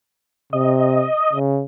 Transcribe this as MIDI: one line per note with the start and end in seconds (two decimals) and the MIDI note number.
0.53 1.06 48
0.53 1.39 75
1.33 1.65 49